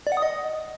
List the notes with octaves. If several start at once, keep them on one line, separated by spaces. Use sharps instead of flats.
D5
F#5
D#6
D#5